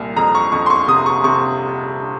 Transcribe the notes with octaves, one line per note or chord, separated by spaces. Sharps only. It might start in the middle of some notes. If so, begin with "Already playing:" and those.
Already playing: C2 A#2
F2 A#5
C#6
F2 C#6
C6
C#6
C3 D#6
C#6
C3 C#6